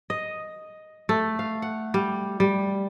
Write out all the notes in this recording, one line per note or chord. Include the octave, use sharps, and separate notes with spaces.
D#5
A3
F5
F#5
G3
G3